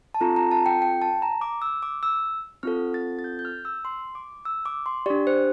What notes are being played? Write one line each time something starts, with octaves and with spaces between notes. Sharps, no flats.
A5
C4 F4 A4 A#5
A#5
A5
G5
G5
A5
A#5
D6
E6
D6
E6
C4 F4 A4 F6
A6
A6
G6
G6
F6
E6
C6
D6
E6
D6
C6
D4 G4 D5
C5